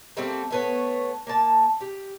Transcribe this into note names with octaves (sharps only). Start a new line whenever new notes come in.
G3 A3 A#3 C4
A3 B3 C#5
A#3 A5
G4